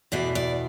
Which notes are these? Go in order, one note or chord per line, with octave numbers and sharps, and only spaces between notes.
E2 B2 D5
D5